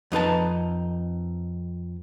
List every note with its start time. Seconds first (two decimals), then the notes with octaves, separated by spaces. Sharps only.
0.12 F2 D#4 B4 A5